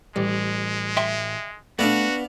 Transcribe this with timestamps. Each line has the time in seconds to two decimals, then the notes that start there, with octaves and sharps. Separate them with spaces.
0.16 A1 G3 G#3
0.97 E5 G5 C6
1.79 A3 B3 D4 F#4 D5 F5 A5